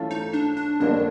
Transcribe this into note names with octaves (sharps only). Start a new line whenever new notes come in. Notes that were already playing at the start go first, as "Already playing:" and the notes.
Already playing: E3 A3 C#4 F4 A4
D#4
D4
D4
F2 D3 G3 A#3 C#4 D4